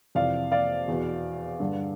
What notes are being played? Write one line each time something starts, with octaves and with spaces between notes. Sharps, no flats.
F2 C3 E3 D5 F5
D5 F5
E2 B2
G2 D3